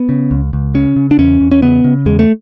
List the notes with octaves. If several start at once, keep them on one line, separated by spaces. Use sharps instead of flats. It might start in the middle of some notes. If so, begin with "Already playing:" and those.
Already playing: B3
C#3
C#2
C#2
C#3 C#4
C#3
D4
E2 C#4
E2
C#4
C#3 B3
C#3
E2 G#3
A3